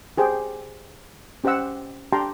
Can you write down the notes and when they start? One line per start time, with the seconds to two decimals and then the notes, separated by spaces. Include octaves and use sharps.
0.18 G4 G#4 C5 G5
1.44 C#4 G4 C5 D#5 F#5 E6
2.13 D4 G4 G5 A5 A#5 C6